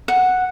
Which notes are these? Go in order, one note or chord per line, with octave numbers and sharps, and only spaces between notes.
F#5